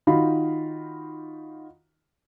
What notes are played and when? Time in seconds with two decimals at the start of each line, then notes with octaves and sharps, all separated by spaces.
0.07 D#3 D#4 F4 F#4 F5 B5